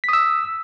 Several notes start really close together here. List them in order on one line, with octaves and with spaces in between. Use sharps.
B6 D#6 E6